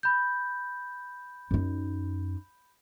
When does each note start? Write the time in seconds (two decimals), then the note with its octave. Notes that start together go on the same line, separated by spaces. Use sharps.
0.03 B5 G6
1.51 F#2 D#4